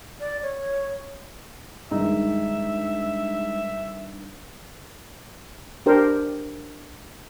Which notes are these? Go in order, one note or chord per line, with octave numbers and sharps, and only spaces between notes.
D5
C#5
G2 D#3 G#3 D#4 E5
D4 G4 A#4 C5